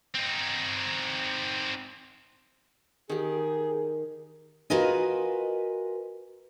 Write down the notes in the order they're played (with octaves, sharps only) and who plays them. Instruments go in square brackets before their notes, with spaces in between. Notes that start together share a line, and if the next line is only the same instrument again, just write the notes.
[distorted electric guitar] C4 D#4
[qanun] D#3 G4 [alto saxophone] G#4
[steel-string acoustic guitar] F4 F#4 A#4 B4 D#5 G#5